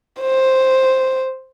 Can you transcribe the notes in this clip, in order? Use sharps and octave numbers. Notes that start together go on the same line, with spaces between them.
C5